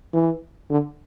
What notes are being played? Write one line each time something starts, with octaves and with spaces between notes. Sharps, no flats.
E3
D3